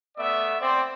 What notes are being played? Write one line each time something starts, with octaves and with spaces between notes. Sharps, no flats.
A3 B3 D5 E5
C4 C5 D5